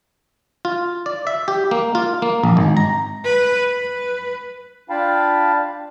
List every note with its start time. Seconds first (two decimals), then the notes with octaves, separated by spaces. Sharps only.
0.65 F4
1.06 D5
1.27 E5
1.48 G4
1.71 A#3
1.95 F4
2.22 A#3
2.44 A#1
2.57 G#1
2.77 A#5
3.25 B4
3.70 B4
4.90 D4 F4 F5 G5 A5 B5